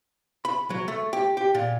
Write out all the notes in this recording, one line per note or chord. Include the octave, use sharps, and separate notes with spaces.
B5
F#3
A3
G4
G4
A#2